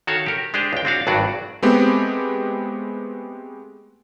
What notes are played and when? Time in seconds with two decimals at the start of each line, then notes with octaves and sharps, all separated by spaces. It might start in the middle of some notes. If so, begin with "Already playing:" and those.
0.07 D#3 F#4 A4 C#5 F5
0.26 G4 A#4
0.54 G#3 D4 G4 G#4 C5
0.73 C#2 G5
0.85 C4 D4 F#4 F5
1.07 G#1 G2 F#3 D4 F#4 D5
1.63 G#3 A3 B3 C4 G4